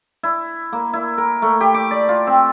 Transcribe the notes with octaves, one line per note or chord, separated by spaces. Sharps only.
E4
A#3
E4
A#4
A3
G4
D6
D5
F4
C4